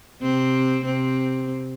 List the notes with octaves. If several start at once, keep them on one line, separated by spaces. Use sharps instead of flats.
C3 C4
C3 C4